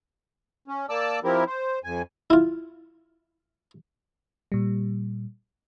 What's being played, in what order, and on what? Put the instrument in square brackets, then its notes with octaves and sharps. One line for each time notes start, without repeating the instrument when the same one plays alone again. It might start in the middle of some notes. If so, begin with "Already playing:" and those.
[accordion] C#4
A#3 D5 A5 D6 E6
F3 C4 E4 G4 A#4
C5
F2 G#5
[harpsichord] E4 F4
[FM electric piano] A#2 G3